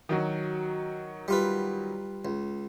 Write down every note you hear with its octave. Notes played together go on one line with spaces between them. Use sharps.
D#3 F#3 F#4
G3 F4 B4
C#2